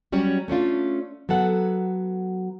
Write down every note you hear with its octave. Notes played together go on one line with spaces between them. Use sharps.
F#3 G3 C#4 C#5
A3 C#4 D4 F4
F#3 B3 A4 F#5